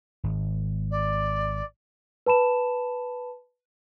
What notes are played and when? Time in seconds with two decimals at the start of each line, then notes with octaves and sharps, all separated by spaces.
0.23 G#1
0.91 D5
2.26 B4 A5 B5 E7